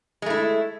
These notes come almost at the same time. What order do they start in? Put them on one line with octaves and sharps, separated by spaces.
G#3 A3 E4